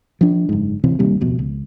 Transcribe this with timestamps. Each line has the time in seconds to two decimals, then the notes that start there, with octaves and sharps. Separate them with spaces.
0.21 F3 D4
0.49 F#1 G#2
0.84 C#2 C3 E3 C4
0.99 D1 D#2 C3 G3
1.21 D1 F2 B2
1.39 C#2